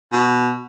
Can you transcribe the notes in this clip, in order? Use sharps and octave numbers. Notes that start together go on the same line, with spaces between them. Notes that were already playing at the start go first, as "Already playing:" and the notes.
B2